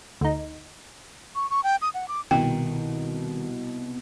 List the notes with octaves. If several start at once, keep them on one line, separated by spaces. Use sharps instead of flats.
D2 D#4
C#6
C#6
G5
D#6
F#5
D6
C2 B2 D#3 G5